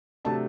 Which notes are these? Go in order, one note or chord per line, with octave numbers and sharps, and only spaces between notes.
C3 F#3 A3 D4 A5